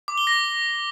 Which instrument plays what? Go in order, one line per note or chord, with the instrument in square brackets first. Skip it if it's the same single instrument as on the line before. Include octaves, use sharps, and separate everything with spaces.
[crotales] D6
G7
A#6